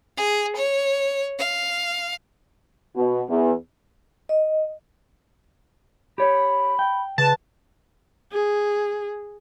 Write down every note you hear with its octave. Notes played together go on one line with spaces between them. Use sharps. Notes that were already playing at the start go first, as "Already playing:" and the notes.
G#4
C#5
F5
B2
E2
D#5
G4 C#5 B5
G5
C#3 B4 A5
G#4